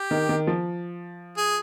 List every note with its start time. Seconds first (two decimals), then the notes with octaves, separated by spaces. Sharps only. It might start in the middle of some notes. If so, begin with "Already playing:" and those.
Already playing: G4
0.11 D#3
0.29 D#3
0.47 F3
1.37 G#4